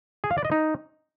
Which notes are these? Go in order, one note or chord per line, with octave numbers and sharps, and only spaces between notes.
G#4
F5
D5
D#5
D#4